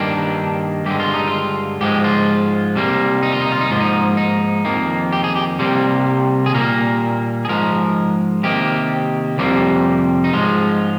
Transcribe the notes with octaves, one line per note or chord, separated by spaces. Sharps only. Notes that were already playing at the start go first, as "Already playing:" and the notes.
Already playing: G2 D#3 A#3 D4
G2 D3 G#3 G4
F4
D#4
F4
G#2 F3 G#3 G4
F4
C3 G3 A#3
D#4
F4
D#4
F4
D#4
G#2 F3 A#3 F4
D#4
D#4
F2 D#3 A#3
G4
G#4
G4
C3 G3 A#3
G#4
A#2 G3 A#3 A#4
G#4
G#2 F3 G#3 A#4
C3 D#3 A#3 G4
F2 C3 G3 A#3
D#4
G#2 F3 G#3 F4